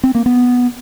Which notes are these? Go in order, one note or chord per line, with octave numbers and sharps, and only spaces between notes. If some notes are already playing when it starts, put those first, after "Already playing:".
C4
A#3
B3